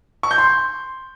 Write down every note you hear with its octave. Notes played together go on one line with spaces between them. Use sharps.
C#6
G6
C6